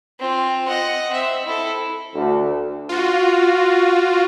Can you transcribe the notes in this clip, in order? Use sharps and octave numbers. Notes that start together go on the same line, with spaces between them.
C4 F4
D#5 F#5
C4 E5
E4 A4
D2
F4 F#4